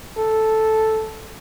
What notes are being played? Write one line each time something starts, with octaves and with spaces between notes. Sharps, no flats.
A4